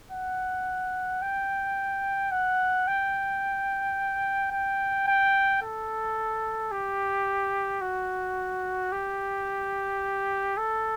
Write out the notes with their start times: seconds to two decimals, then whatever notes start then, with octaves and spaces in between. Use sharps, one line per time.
0.11 F#5
1.22 G5
2.31 F#5
2.87 G5
4.51 G5
5.07 G5
5.62 A4
6.71 G4
7.81 F#4
8.92 G4
10.57 A4